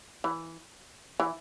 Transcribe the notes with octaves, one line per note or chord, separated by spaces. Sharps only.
E3
E3